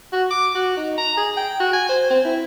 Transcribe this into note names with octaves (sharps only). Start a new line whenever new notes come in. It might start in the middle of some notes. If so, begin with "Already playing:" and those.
F#4
D6
F#4
D#4
A#5
G#4
G5
F#4
G#5
C5
C4
E4